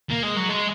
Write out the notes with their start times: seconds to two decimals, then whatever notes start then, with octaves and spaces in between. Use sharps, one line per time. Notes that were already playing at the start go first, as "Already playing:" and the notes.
0.10 A#3
0.23 G#3
0.36 F#3
0.49 G#3